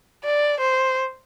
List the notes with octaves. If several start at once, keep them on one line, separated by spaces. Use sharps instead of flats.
D5
C5